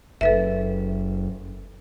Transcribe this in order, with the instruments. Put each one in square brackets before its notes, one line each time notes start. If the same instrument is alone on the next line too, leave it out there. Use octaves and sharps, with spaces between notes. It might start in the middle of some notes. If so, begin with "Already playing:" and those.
[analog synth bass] F#1 [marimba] A4 B4 E5